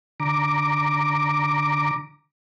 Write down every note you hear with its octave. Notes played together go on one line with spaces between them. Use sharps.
D3 A#5 D6